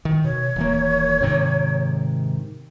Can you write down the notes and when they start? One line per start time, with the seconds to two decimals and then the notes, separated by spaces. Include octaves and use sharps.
0.05 D#3
0.24 B2 C#5
0.56 D#1 E3 A#3
1.21 G#2 C3 D#3